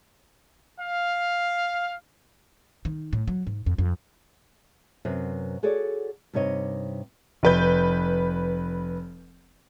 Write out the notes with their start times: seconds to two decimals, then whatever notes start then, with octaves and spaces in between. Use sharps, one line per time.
0.80 F5
2.85 D#3
3.13 A2
3.28 F#3
3.47 G#2
3.66 F2
3.78 F2
5.05 F#2 C3 B4 C5
5.63 F#4 G#4 A4 C#5 D5
6.33 G2 C3 D#4 C#5 D#5
7.43 F1 B4 G6